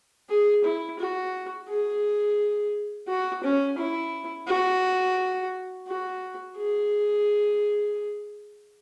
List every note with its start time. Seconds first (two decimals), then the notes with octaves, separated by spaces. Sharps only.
0.29 G#4
0.64 E4
0.99 F#4
1.69 G#4
3.08 F#4
3.44 C#4
3.78 E4
4.48 F#4
5.88 F#4
6.57 G#4